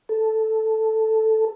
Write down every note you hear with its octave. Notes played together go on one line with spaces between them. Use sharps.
A4